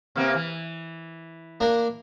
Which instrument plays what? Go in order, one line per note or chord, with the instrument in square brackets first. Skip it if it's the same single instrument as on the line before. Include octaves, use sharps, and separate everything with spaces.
[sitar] C3 A#3 B3
E3
[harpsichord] A#3 D4 A#4